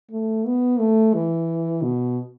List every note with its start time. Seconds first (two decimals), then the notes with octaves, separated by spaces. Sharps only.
0.11 A3
0.46 B3
0.79 A3
1.14 E3
1.82 B2